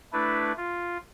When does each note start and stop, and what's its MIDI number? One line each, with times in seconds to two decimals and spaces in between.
0.13 0.52 57
0.13 0.52 62
0.13 0.52 64
0.13 0.52 71
0.57 0.97 65